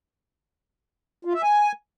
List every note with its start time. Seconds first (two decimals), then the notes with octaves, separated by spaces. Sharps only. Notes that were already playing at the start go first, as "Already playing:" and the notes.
1.25 F4
1.34 E5
1.43 G#5